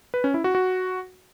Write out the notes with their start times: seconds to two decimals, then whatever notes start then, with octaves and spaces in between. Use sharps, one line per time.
0.14 B4
0.24 C#4
0.34 E4
0.44 F#4
0.55 F#4